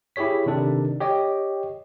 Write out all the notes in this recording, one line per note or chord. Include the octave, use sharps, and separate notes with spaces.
E4 G4 G#4 C#5 B6
C3 D#3 D4 A4
G4 C#5 D#5 G5